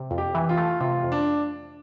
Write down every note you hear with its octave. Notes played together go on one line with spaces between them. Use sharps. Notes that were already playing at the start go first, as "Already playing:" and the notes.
Already playing: C3
F2
G4
E3
F4
A3
C3 F4
F2
D4